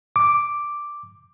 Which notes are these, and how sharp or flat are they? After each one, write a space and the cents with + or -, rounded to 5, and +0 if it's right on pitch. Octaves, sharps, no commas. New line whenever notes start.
D6 +0